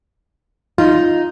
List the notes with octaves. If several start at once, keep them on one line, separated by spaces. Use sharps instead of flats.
D#4 F4